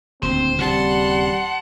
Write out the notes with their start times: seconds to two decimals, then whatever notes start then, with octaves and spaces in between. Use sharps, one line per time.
0.23 D#1 D2 C4 C5
0.60 D#1 C#3 G3 C4 F#5 A5 C6